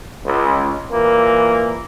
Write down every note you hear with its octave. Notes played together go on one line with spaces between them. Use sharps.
C#2
A#2 E3 A#3